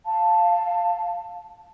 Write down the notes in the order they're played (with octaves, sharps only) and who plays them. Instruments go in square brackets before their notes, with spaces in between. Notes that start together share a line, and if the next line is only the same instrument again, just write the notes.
[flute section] F5 A5